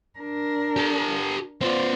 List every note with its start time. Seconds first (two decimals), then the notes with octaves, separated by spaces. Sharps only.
0.19 D4 A#4
0.77 G4 A4
1.61 B3 F4 C5 D5